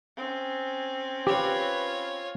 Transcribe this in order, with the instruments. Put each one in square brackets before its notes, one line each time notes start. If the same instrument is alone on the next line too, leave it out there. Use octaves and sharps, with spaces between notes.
[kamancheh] C4 C#4
[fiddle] F4 C#5 [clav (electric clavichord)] G4 [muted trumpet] B4